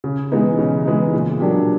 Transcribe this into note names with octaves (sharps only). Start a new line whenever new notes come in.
C#3
E3 G#3 B3 D#4
C#3
E3 G#3 B3 D#4
A#2
F#3 A#3 D4 G4